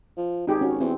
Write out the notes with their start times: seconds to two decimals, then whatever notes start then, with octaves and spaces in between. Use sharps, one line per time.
0.17 F3
0.47 G#1 D#4 G4 G#4
0.61 C#4 F#4
0.80 E2 C4